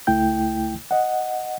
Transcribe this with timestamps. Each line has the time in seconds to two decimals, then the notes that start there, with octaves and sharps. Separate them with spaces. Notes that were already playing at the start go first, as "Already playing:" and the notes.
0.07 C#2 A3 E4 G5 G6
0.91 D#5 F#5